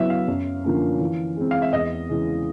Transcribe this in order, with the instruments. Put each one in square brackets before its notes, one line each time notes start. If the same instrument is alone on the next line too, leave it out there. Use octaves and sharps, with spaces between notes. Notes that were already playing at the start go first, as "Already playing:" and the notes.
Already playing: [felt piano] C#3 F#3 B3 E4 [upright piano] E5
[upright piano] F5
[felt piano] F#2
D3 F3 A#3 C#4
E3
G#3 C4
[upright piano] F5
E5
[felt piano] E2 [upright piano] D#5
[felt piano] C#3 E3 G#3